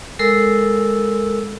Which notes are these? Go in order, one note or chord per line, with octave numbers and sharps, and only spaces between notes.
G#3 A4 A#4 E6